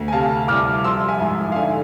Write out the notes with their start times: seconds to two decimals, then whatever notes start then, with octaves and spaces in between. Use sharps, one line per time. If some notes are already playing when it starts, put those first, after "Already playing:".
Already playing: D2
0.08 G#5
0.12 C3 F5 A5
0.48 C2 D6 F6
0.84 F3 C6 E6
1.08 E5 G#5
1.20 G#2
1.52 F5
1.56 D3 E5 G#5